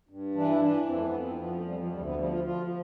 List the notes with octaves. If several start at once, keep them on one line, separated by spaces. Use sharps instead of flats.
G2
E3 D4
E4
E3 D4
F2 C4
A3
B3
F2
C4
F3 B3
A3
F2 G3
F3
D2 G3
B3
F3 G3
F4
F3 F4